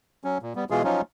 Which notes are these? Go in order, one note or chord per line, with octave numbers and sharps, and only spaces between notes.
F#3 C#4
A#2
G3 B3
B2 E3 G#3 F4 G#4
F3 F#3 C#4 D#4 F4